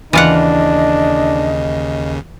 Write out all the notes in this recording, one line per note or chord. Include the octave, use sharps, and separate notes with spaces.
D#2 C#3 E3 D4 F4 D#5 F#5